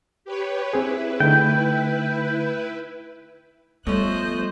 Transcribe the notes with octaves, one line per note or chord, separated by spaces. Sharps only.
G4 B4 C#5
C4 E4 G#4 B4
D3 A3 D#4 G5
F3 G3 A3 B3 C5 C#5 D#5 F#6